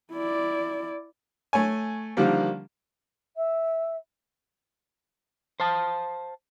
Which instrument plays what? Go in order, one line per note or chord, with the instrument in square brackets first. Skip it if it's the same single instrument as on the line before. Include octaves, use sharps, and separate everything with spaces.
[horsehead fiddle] E4 D5
[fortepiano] A3 C#5 G#5
D3 D#3 F3 G3 A#3
[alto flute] E5
[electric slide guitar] C5 F5 A5